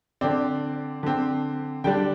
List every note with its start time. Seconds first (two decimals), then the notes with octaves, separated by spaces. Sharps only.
0.21 D3 C4 D5
1.03 D3 C4
1.84 D3 G3 D4 G5